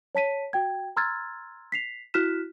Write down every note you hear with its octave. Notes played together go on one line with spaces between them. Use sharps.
C#5 A5 B6 D#7
F#4 G5 G#6
A#5 C6 E6 F6 G#6 A6
B6 C7 F7
E4 F#4 F6 F#6 B6 E7